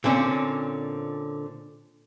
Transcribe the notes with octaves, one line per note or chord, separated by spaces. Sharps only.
A#2 D3 C4 C#4